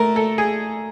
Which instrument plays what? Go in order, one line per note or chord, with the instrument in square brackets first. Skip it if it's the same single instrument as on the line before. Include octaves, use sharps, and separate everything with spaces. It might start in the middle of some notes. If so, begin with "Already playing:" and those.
Already playing: [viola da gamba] A3 [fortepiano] A#4
[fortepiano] A4
G#4